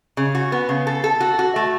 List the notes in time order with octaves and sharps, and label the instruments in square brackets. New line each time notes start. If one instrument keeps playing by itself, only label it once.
[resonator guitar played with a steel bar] C#3
F#4
B3
C#3
A4
A4
F#4
F#4
A3